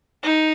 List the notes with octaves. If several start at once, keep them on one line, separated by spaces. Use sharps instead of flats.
D#4